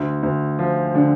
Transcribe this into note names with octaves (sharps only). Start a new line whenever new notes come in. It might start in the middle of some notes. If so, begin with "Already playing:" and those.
Already playing: D2
D2
F3
D3